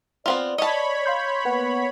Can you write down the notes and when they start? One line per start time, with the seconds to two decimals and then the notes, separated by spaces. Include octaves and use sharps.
0.26 B3 C4 F4 D5
0.58 C#5 D#5 A5 B5
1.06 F5 C6 G6
1.45 A#3 B3 B4 F#5